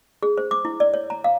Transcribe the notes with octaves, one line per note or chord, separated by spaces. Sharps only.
G#4
C5
D6
E4
D5
C#5
A#5
F5